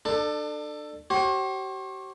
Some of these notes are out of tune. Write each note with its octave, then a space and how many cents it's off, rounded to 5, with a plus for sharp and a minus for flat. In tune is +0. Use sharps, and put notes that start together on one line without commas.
D4 +30 A4 +10
G4 -45 C5 +45